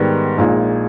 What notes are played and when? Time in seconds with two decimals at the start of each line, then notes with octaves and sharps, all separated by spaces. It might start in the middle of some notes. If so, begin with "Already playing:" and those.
Already playing: G#2 D#3 G3 B3
0.38 A#1 A#2 G#3 D#4